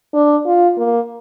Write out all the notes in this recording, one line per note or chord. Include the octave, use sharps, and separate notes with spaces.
D4
F4
A#3